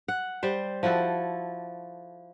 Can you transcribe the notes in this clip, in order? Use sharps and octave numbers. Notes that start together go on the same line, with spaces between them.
F#5
G3 C5
F3 E4 F#4 A4